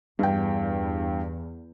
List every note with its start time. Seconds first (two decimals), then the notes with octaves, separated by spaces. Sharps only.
0.19 E2 G2 G5